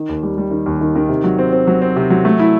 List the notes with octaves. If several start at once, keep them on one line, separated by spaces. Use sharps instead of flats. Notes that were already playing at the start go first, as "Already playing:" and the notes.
Already playing: D#3
D#2
G3
G3
D#3
D#2
D#3
D#3
C3
F#3
C4
C4
F#3
C4
C3
F#3
A3
E4